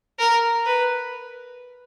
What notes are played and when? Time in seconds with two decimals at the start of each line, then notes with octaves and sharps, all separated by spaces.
0.19 A#4
0.66 B4